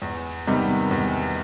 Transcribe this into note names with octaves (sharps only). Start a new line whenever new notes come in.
E2
C3 D#3 G3 B3
E2